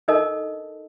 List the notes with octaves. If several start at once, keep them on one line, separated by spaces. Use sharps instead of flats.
D4 D#4 A4 A#4 D#5 A5